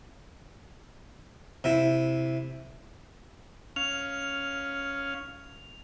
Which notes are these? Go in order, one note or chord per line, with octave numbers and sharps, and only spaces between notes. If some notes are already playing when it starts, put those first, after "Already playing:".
C3 E4
C#4 F5 F7